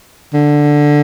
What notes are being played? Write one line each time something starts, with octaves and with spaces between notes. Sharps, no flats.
D3